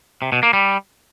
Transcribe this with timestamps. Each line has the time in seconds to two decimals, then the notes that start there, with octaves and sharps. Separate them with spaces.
0.22 C3
0.32 B2
0.43 A#3
0.53 G3